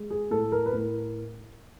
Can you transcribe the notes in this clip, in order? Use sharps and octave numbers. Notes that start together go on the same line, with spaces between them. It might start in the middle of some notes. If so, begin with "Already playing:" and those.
Already playing: G#3
G#4
A2 A4
A#4
B4
A2 A#4